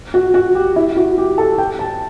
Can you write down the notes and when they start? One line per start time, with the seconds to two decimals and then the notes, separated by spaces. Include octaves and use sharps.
0.14 F#4
0.34 F#4
0.55 G4
0.76 E4
0.97 F#4
1.18 G4
1.38 A4
1.58 G5
1.79 A5